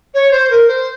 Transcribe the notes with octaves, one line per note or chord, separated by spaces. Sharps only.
C#5
C5
A#4
C5